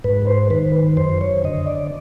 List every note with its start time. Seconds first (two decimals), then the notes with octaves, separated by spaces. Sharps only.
0.04 G#2 B4
0.27 C5
0.50 D#3 B4
0.97 F#2 C5
1.21 C#5
1.44 D3 D#5
1.67 D5